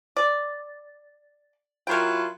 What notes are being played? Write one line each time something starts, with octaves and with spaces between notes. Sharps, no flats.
D5
F#3 E4 F4 A#4 G5